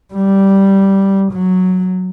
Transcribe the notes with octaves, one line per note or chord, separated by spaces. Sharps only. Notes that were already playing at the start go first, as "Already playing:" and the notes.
G3
F#3